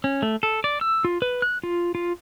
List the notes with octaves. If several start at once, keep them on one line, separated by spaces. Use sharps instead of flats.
C#4
A3
A4
D5
E6
F4
B4
F#6
F4
F4